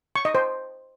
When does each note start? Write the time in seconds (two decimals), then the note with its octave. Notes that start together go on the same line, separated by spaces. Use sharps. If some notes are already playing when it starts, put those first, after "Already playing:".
0.16 C#6
0.25 D#5
0.35 C5